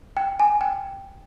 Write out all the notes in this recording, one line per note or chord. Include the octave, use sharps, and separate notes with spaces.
G5
G#5
G5